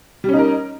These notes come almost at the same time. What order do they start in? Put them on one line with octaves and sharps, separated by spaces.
G3 C#4 D#4 A#4